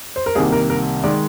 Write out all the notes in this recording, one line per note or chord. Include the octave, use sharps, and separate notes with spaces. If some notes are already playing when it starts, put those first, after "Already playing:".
C5
A#4
C2 C3 D#3 G3 A#3 G#4
A#4
A#4
D#3 G#3 D5